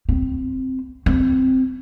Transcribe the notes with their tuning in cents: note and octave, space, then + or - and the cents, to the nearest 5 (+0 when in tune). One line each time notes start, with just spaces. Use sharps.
C4 -5
C4 -10